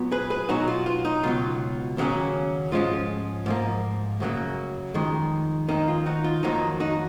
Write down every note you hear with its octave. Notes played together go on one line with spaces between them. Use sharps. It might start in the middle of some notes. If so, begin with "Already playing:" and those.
Already playing: A#2 F#3 B3
G#4 B4
G#4 B4
B2 F#3 B3 D#4 F#4
F4
F4
D#4
C#2 B2 F#3 F4
D#2 C#3 F#3 A#3 C#4
G#2 F3 G#3 C#4 F4
G#2 F3 A#3
F#2 C#3 F#3 A#3
F2 D#3 G#3
D#2 D#3 A#3 D#4
F4
D#4 F#4
F4
F2 D#3 F#3 A#3 D#4
D#4 F#4